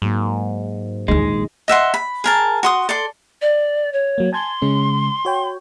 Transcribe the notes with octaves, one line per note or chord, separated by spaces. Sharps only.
G#2 F#3 A#3
A#1 D#2 G#3 D#4 G#4 D#5
D#5 E5 F#5 C6
B5
G#4 A#4 A5
F#4 C6 D#6
A4 D5 C6
D5
C#5
F#3 A#3
G#5 A5 C6 G#6
C#3 G#3 C#4
F#4 C#5 G5